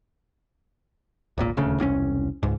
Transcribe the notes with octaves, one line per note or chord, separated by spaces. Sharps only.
D1 G#1 A#2
D#1 D2 C#3
E1 C2 C4 C#4
C#2 G#2